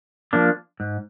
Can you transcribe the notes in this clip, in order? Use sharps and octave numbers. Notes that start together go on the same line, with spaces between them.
F3 A#3 D4
G#2